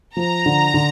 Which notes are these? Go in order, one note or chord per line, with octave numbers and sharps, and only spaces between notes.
F3 A#5
D3
D3